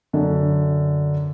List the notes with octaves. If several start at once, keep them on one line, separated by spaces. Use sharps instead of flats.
F#2 D3